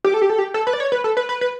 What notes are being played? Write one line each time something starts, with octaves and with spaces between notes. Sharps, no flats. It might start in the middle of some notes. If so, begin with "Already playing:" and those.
G4
A4
G4
A4
G4
A4
B4
D5
C#5
B4
A4
B4
B4
B4